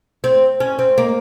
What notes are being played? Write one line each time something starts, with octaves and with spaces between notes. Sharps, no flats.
C4
C#4
C4
A#3